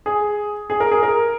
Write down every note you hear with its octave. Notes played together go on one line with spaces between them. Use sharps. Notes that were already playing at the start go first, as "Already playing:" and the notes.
G#4
G#4
A#4
G#4
A#4